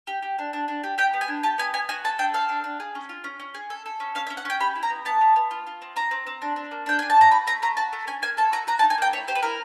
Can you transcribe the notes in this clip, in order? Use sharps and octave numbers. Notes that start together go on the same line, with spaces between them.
G4
G4
D4
D4
D4
G4
G4 G5
B3
G#5
D4
G4 A5
B3 G#5
B3 G#5
F#4 G#5
A4 A5
D4 G5
A4 F5
D4
D4
G#4
C#4
F4
C#4
C#4
G#4
A4
A4
C#4
C#4 F5
E5
C#4
F#5
C#4 G5
G4 B5
E4
A#5
B3
B3 A5
B3
B3
F4
F4
C4
C4 A#5
C4
C4
D4
D4
A#3
D4 G5
D4 G#5
A5
F#4 A#5
F#4 B5
A3 A#5
A3 A#5
F#4 A5
A3
C#4 G#5
A#3 G#5
A4 A5
F#4 A#5
F#4 A#5
A5
D#4
G#5
A#3 G5
E4 C#5
G4 C5
B4
E4 A#4